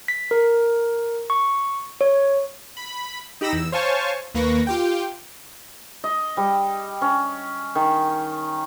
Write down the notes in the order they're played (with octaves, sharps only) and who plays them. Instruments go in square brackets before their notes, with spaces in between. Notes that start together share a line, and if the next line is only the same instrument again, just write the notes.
[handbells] B6
A#4
C#6
C#5
[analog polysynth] B5
D#4 G4 B5 E6 A#6
E2 E6
C5 C#5 F5 G#5 A5 C#6
D#2 A#3 B4 C#6 A#6
F4 G4 G5
[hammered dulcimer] D#5
G3
C#4
D#3